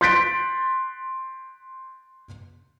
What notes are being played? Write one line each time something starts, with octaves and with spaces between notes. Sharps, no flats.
C6 F#6 G6 A6 B6 D7